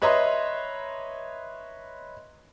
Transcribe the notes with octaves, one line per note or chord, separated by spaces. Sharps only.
B4 C#5 D#5 E5 A#5 C6